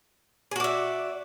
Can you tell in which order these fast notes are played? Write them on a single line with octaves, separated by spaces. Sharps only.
G#4 F#4 D5 E5